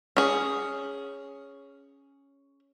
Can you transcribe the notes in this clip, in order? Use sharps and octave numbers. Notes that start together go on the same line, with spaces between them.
C#4 G#4